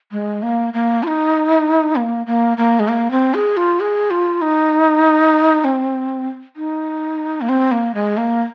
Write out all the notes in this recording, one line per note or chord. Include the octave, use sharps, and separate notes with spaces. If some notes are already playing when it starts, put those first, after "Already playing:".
G#3
A#3
A#3
F4
D#4
A#3
A#3
A#3
G#3
A#3
C4
G#4
F4
G#4
F4
D#4
C4
D#4
A#3
C4
A#3
G#3
A#3